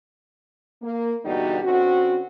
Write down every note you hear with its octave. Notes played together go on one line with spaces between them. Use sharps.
A#3
E2 B2 D3 G3 D#4 F#4
D3 C4 C#4 F#4